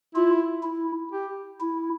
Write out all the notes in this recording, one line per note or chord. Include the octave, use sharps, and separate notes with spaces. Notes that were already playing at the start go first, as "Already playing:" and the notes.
E4 F4
E4
G4
E4